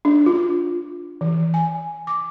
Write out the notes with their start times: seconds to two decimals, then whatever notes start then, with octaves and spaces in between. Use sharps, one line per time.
0.05 D4
0.26 F4
1.21 E3
1.54 G#5
2.07 D6